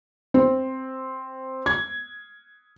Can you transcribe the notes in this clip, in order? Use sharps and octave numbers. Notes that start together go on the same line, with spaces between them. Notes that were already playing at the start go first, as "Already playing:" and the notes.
C4
G#6